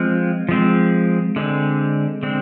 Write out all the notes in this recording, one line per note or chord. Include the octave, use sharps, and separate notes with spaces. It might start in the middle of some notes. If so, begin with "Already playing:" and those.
Already playing: F3 G#3 C4
F3 G#3 C4
D3 G#3 C4
D3 G#3 C4